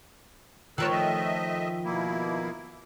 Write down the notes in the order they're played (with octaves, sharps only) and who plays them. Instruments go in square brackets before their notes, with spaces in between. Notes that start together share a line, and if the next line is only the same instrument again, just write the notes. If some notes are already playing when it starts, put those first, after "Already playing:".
[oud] D#3 F3 C#5 [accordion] A#4 E6 F#6
[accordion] A3 D#5 E5
B2 A#3 E4